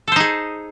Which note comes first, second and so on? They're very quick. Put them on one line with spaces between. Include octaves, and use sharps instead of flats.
A4 C5 D#4 G#4